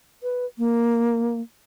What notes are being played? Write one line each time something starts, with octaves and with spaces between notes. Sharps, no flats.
B4
A#3